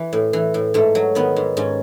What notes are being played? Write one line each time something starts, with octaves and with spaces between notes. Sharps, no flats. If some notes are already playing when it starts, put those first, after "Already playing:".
Already playing: E3
A2
E3
A2
G#2 A3
F#3
D#3 B3
G#2
G#2 C#4